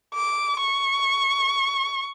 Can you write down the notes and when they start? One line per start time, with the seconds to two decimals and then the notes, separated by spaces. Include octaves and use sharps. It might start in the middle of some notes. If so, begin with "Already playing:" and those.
0.14 D6
0.60 C#6